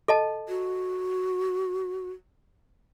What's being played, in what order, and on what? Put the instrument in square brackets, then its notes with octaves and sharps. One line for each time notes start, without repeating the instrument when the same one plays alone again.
[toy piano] A4 D#5 A5
[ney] F#4